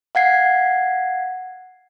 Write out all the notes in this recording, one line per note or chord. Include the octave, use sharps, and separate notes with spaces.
F5 F#5 G#6 C7